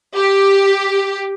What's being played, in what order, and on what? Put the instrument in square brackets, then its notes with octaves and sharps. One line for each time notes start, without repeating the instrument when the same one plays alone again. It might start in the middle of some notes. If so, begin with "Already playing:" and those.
[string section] G4